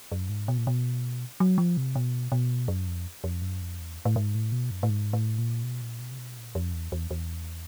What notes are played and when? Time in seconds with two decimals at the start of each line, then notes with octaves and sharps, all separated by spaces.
0.12 F#2
0.29 G#2
0.48 B2
0.58 A#2
0.67 B2
1.40 F#3
1.58 F3
1.77 C3
1.96 B2
2.32 B2
2.68 F#2
2.87 F2
3.24 F2
3.42 F#2
3.61 F2
3.80 E2
4.05 A2
4.16 G#2
4.35 A2
4.52 B2
4.71 F#2
4.83 A2
4.90 G#2
5.13 A2
5.38 A#2
5.63 B2
5.81 A#2
6.00 B2
6.11 C3
6.18 B2
6.37 A#2
6.55 F2
6.73 E2
6.92 E2
7.11 E2